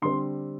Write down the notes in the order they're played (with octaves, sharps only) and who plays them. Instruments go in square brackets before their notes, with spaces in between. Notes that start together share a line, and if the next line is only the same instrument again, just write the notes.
[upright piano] D3 G3 C4 C6